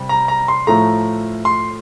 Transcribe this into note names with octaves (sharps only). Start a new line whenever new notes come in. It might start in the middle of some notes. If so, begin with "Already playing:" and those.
Already playing: C3 G3
A#5
A#5
C6
A2 F3 A3 A#5
C6